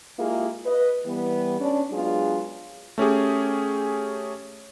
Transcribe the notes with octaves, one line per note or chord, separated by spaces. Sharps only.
G#3 A#3 E4 F4 G4 G#4
B4 D#5
E3 G3 B3
C#4 D4
F#3 G#3 B3 D4 F4 G#4
A3 C#4 G4 G#4